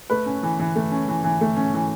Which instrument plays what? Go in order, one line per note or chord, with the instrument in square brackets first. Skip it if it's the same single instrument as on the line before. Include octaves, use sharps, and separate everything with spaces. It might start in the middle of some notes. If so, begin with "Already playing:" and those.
[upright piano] A3 B4
C#4
E3
E3
A3
C#4
E3
E3
A3
C#4
E3